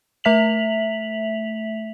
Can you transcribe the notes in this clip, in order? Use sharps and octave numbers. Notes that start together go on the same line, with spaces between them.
A3 E5 B6 F7 F#7